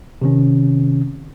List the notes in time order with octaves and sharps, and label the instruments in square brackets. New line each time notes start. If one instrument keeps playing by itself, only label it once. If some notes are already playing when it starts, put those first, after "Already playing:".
[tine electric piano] C3 D#3 C#4